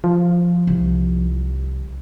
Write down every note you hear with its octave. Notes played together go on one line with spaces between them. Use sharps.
F3
C2